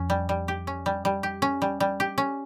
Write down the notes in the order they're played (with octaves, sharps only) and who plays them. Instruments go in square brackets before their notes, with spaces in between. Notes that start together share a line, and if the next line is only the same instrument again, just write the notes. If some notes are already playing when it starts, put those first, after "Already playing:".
Already playing: [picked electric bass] F2 [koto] C#4
[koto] G3
G3
G4
C#4
G3
G3
G4
C#4
G3
G3
G4
C#4